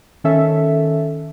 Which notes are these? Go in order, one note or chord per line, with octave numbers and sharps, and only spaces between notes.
D#3 C#4 A4 E5